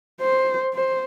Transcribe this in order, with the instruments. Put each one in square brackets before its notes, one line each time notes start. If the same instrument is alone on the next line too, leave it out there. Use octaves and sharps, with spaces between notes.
[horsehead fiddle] C5
C5